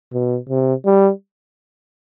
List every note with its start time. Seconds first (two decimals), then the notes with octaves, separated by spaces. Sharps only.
0.13 B2
0.49 C3
0.86 G3